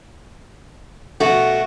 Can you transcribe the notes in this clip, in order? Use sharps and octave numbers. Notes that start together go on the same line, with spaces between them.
B2 A3 F#4